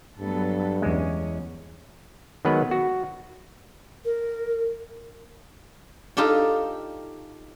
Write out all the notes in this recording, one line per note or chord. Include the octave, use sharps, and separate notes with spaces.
G2 F#3 B3 A4
E2 G#3 C#4
D#3 F#3 G#3 B3 B4
F#4
A#4
D#4 F4 G4 A4 D5 G5